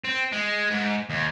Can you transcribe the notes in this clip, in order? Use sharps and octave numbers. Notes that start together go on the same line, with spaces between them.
C4
G#3
G#2
D#2